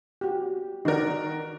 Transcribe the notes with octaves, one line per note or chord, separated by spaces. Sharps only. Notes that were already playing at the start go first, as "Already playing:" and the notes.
F#4 G4
D#3 D#4 F#4 A#4 D5